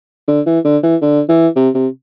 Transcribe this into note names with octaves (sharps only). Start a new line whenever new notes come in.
D3
E3
D3
E3
D3
E3
C3
C3